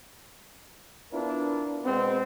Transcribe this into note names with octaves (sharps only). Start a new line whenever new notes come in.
B3 D4 E4 F4 A#4 B4
B2 G#3 B3 C4